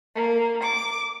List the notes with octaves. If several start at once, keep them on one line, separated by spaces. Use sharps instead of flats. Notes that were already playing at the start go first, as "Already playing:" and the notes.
A#3
D6